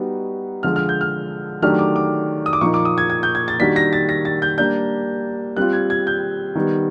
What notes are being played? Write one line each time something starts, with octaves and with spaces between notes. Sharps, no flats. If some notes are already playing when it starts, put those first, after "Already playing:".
Already playing: G3 B3 D#4 F#4
D3 F3 G#3 F6
F6
G6
F6
D#3 F#3 A3 D4 G4 F6
D6
D6
D#6
D6
A#2 F3 A#3 D#4 C#6
D6
D#6
G#6
G#6
G6
G#6
A6
D#3 G3 A#3 D4 F#4 B6
A#6
A6
A#6
A6
G6
G3 A#3 D4 G6
G3 C4 F4 F#6
G#6
G#6
G6
D#3 G3 B3